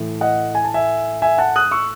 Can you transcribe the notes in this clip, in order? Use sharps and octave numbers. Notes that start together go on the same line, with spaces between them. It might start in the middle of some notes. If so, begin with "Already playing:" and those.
Already playing: A2 E3 A3
D#5 F#5
G#5
A5
E5 G#5
E5 G#5
F#5 A5
D#6 F#6
C#6 E6